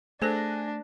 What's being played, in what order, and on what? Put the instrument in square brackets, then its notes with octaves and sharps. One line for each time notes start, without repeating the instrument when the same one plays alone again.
[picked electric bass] A3 [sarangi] D4 [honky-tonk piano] G#4 F#6 A#6 [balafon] A4 C5